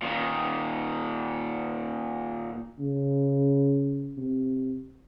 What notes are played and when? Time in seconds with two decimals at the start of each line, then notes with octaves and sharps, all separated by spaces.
0.02 A#2 D#3
2.80 C#3
4.18 C3